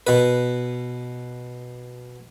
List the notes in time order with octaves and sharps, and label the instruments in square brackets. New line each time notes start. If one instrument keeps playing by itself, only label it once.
[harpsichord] B2 B4